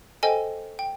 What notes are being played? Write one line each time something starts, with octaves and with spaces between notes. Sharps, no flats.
A4 C5 D#5 G5 G#5
G5